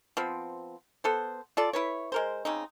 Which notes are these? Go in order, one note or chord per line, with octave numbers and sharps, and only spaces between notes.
F3 B3 C4
B3 A4 C5
F4 A4 D5
E4 B4 C#5
G#3 A#4 C5
C#3 C4 D#4